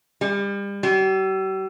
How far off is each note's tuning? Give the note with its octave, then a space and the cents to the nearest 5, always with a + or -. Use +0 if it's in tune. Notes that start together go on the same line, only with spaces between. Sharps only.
G3 +35
G3 -45